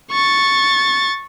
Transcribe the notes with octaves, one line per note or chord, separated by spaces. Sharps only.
C#6 A6